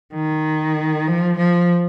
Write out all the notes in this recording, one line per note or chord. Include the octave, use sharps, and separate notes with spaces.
D#3
F3
F3